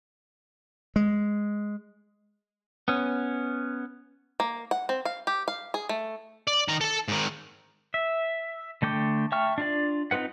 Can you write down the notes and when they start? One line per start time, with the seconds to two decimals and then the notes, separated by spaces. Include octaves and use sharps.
0.96 G#3
2.88 B3 C#4
4.40 A#3
4.71 F#5
4.89 C4
5.05 F5
5.27 G4
5.48 F5
5.74 G#4
5.89 A3
6.47 D5
6.68 D#3 A#5
6.81 A4 A5
7.08 G#2 D#3
7.94 E5
8.82 D3 A3 G5 D6
9.32 E5 G5 A5 C#6 F6
9.58 D4 F4 D5
10.11 C4 D#4 F4 B4 F#5